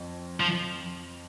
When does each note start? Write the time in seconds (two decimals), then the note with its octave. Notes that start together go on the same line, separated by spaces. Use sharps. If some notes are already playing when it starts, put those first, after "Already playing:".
Already playing: F2
0.40 F3